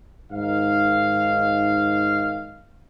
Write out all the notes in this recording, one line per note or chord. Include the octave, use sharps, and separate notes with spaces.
G#2 D#3 D#4 F5